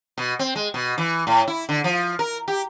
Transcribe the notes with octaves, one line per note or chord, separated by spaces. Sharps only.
B2
C4
G#3
B2
E3
A2
E4
D3
F3
A#4
G4